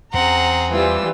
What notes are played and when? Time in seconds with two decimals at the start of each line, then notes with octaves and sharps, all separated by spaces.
0.14 E2 C4 C#4 G#4 F#5 A#5
0.72 E3 G3 F4 E6